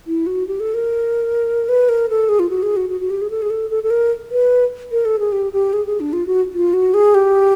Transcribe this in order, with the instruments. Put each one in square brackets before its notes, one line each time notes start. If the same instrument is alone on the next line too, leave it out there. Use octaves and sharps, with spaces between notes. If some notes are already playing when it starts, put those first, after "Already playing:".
[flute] E4
F#4
G4
A4
A#4
B4
A#4
A4
G#4
F4
F#4
G#4
F#4
F#4
F#4
G4
G#4
A4
G#4
A4
A4
A4
A#4
B4
A#4
A4
G#4
G4
G4
G#4
G#4
D4
F4
F#4
F4
F#4
G#4
G4